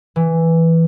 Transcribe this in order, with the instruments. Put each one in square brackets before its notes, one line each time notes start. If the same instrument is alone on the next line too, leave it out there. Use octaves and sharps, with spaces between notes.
[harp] E3